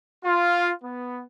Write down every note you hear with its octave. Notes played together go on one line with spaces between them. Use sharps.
F4
B3